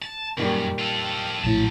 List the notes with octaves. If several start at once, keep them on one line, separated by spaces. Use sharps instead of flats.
A5
F#2 A#2 D#3 G3
F4 A4
A#1 A2 F#3 A5